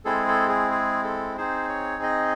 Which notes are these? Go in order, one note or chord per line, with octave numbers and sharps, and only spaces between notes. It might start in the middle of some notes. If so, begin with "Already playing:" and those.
G#3 C4 E4 G#4 A4
A4
G#4
G#4
A4
C4 D#4 G#4 C5
C#5
D#5